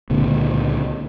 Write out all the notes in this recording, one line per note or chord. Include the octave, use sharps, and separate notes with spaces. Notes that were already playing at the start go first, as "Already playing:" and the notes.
C#2 A#2 D3